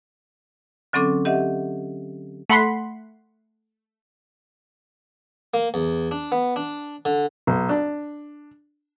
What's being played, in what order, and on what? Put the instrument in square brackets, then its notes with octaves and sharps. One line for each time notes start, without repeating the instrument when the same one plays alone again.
[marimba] D3 F#3 C4 C#4 A4 D6
G4 D#5 E5 F#5
[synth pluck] A3 F#5 B5 C6 B6
[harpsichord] A#3
E2
D4
B3
D4
D3
[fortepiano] B1
D4